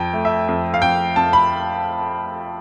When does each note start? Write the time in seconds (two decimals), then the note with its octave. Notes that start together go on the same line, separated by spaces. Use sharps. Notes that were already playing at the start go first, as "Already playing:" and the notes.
Already playing: F2 G5
0.13 A3
0.25 E5
0.49 F2
0.74 F5
0.82 F2 G5
1.16 F2 A5
1.33 B5